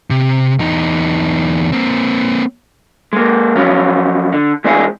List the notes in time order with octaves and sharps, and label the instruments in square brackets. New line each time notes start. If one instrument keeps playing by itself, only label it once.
[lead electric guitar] C3
E2 D#4
A#3 C4
[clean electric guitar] G#3 A#3
F3 F#3 C#4 F4
D3
E3 G#3 C4 D4 G#4